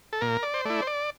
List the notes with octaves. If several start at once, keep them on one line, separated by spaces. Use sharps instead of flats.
A4
A#2 A#4
D5
C5
A3 E4 D5
C5
D5